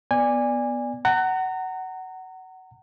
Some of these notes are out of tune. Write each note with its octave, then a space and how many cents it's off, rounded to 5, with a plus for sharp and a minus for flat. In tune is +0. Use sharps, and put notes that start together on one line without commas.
B3 +0 D5 +0 G#5 -20
F#5 +20 A#5 -30